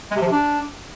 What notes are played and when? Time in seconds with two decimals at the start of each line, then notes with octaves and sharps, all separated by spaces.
0.11 G#3
0.16 C3
0.21 F3
0.26 C3
0.32 D4